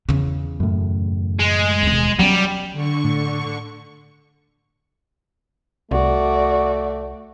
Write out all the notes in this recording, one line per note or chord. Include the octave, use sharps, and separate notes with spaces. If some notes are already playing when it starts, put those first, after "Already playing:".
E2 C#3
F#2 A2
G#3
E1 D#2
F#3 G3 B3 C#4
D3 C#6
A2
C2 A3 F#4 D5